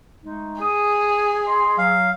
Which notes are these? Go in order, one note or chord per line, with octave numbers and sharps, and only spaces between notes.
G#3 A3 D#4
G#4 D#6
D#5 C6
F#3 F5